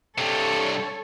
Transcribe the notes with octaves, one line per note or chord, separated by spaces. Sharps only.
G2 C3 A4 C#5